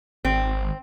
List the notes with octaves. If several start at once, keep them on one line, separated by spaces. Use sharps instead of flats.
G#1 C4